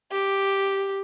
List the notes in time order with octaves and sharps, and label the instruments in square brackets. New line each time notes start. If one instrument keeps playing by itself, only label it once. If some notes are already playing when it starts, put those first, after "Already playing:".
[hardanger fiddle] G4